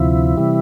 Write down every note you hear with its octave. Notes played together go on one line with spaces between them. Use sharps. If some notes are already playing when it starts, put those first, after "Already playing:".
Already playing: D2 C3 F3 E4
C3 E3 G3